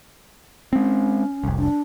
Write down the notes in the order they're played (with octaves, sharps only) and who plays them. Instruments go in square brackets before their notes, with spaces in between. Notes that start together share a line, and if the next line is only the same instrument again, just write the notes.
[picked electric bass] G#3 C4 [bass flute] C#4
[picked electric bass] F1 C2
[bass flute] D4